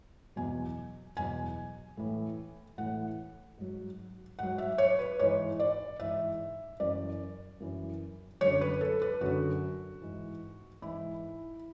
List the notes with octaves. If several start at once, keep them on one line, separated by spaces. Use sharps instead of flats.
E2 B2 F#3 G#5
E2 B2 F#3 G#5
A2 E3
A2 E3 F#5
G#2 F#3
G#2 F#3 F#5
E5
C#5
B4
G#2 E3 C#5
D5
G#2 E3 E5
F#2 E3 D5
F#2 E3
F#2 D3 F#3 C#5
B4
A4
B4
F#2 D3 F#3 F#4
G#2 E3
G#2 E3 E4